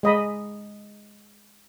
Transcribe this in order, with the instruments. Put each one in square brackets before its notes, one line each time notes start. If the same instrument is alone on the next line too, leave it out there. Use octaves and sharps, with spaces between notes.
[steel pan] G#3 D#5 B5